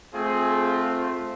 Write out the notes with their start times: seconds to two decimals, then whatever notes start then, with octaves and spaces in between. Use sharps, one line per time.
0.13 A3 C4 F4 G#4
0.88 C5